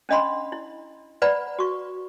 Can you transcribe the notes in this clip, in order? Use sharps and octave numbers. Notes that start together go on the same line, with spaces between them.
C#4 D4 D#5 F#5 B5 C6
E4
B4 D5 F#5 A#5 B5
F#4 C#6